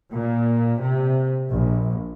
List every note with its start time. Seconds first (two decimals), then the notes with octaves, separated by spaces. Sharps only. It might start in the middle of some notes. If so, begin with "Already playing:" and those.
0.13 A#2
0.80 C3
1.51 A#1